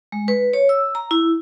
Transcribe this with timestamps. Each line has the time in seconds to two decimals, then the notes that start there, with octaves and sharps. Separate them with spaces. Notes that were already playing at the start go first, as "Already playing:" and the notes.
0.12 G#3
0.28 B4
0.53 C#5
0.69 E6
0.95 A#5
1.11 E4